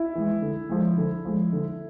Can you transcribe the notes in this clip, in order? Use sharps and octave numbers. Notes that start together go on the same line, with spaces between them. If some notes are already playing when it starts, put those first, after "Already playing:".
Already playing: E4
E3 G#3
D3
F3 G#3
D3
F3 G#3
D3